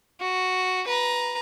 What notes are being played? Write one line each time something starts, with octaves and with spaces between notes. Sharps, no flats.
F#4
B4 A#5